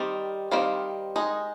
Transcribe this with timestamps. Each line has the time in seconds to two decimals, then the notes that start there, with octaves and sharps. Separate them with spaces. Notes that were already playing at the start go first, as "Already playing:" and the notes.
Already playing: D#3 G3 C4
0.51 D#3 G3 C4 F5
1.16 G#3 D#4